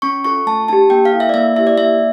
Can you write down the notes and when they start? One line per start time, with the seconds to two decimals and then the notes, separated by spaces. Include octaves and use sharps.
0.02 C#4 C#6
0.24 F4 A4 C#6
0.47 A3 A5
0.68 D4 G4 A5
0.90 A#3 G5
1.05 F5
1.13 E4 A4
1.20 E5
1.29 D5
1.34 A#3 E5
1.56 E4 G4 E5
1.67 D5
1.78 A#3 E5